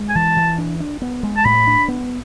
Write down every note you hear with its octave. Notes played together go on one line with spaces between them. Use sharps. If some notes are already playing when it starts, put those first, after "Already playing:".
Already playing: G#3
G#5
E3 A5
E3
D4
D4
B3
G#3
A5
A2 B5
D4
B3